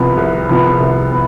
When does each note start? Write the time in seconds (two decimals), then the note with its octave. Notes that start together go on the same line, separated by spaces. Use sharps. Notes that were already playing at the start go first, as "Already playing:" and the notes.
Already playing: C2 C3 F3 B3
0.17 C2
0.49 C3 F3 B3
0.80 C2
1.12 B3